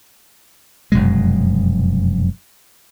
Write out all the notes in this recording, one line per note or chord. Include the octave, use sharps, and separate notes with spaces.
F1 F#2 B2 G#3